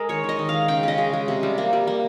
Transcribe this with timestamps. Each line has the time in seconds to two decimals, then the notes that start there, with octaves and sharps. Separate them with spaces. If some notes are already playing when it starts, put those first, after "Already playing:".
Already playing: G#3 G#4 A#4
0.09 D#3 C#5
0.24 D#3 D#5
0.39 D#3
0.49 G#3 F5
0.68 C#3 G5
0.83 C#3 D#5
0.98 G#3
1.13 G#3
1.28 C3
1.43 G3
1.58 A#3
1.73 G3
1.87 A#3